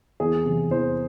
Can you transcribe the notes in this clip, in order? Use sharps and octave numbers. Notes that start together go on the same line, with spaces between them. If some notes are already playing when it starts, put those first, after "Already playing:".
E2 G#4
C3 E3
E2 C5